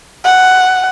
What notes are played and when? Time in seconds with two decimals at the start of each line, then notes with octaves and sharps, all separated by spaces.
0.25 F#5